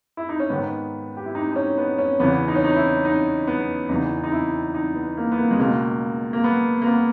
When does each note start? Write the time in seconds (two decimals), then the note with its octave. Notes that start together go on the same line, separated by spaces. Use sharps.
0.17 E4
0.29 D#4
0.40 C#4
0.49 G#2 D#3 B3
1.17 G4
1.25 E4
1.35 D#4
1.52 D#4
1.56 C#4
1.78 B3
1.98 C#4
2.20 E2 C#3 E3 B3
2.48 D#4
2.56 C#4
2.65 D#4
2.76 E4
3.05 D#4
3.47 B3
3.89 E2 C#3 E3 D#4
4.23 D#4
4.32 E4
4.74 D#4
4.95 B3
5.17 A#3
5.32 B3
5.38 A#3
5.51 G#3
5.59 C#2 B2 A#3
6.33 A#3
6.44 B3
6.82 A#3
6.87 B3